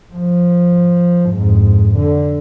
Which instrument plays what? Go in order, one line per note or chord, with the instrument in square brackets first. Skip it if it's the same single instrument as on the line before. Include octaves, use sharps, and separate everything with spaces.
[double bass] F3
F2 G#2
D3